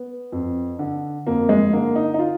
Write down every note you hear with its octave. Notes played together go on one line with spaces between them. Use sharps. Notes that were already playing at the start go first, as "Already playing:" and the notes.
Already playing: B3
F2
D3
F2 A#3
G#3
D3 A#3
D#4
D#4
F4